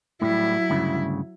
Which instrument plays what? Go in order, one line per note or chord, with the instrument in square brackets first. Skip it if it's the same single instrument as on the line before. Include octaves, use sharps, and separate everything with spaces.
[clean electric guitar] A2 G3 [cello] F#3 E4
[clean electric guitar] D2 G2 C#3